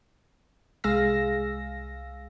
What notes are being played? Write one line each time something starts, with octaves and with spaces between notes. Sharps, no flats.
C2 G#3 G#4 F5 E6 A#6